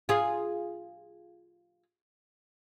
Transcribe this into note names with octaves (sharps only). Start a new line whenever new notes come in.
F4 G#4